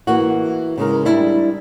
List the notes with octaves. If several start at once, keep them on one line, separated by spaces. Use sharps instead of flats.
E3 A#3 F#4
C#3 G#3 A#4
G3 D4 E4